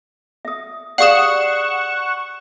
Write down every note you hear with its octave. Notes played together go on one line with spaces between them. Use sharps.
E5 D#6
G4 G#4 D5 F5 F#5 C#6 D#6 E7